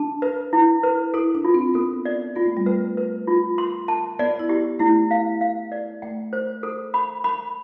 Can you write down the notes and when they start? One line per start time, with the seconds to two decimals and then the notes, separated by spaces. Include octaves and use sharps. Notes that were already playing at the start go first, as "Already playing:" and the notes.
Already playing: D4 A5
0.22 B4
0.53 E4
0.83 B4
1.14 E4 A4
1.35 D4
1.44 F4
1.54 C4
1.74 B3 A4
2.05 D5
2.36 B3 F4
2.46 A3
2.57 G3
2.66 A3 B4
2.97 B4
3.27 F4
3.58 C6
3.88 A5
4.19 B3 D5
4.39 E4
4.49 G4
4.79 A3 E4
5.11 F5
5.41 F5
5.72 D5
6.02 A3 G5
6.33 C5
6.63 A4
6.94 B5
7.24 B5